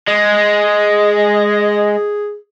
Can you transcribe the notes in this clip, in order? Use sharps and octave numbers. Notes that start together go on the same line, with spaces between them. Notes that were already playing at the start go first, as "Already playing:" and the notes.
G#3 D#5
G#4